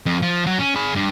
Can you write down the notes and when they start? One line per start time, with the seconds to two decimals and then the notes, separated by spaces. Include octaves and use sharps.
0.06 F2
0.22 F3
0.47 F#3
0.59 C#4
0.75 G#4 B5
0.95 G2